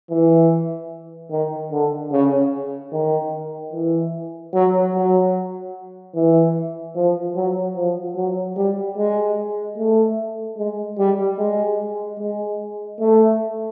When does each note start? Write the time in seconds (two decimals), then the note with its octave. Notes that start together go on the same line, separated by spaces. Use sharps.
0.10 E3
1.31 D#3
1.71 D3
2.12 C#3
2.92 D#3
3.73 E3
4.53 F#3
4.94 F#3
6.15 E3
6.95 F3
7.36 F#3
7.76 F3
8.16 F#3
8.57 G3
8.97 G#3
9.77 A3
10.58 G#3
10.98 G3
11.39 G#3
12.19 G#3
13.00 A3